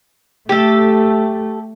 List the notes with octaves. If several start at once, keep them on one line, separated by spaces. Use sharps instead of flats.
A3 G4 A4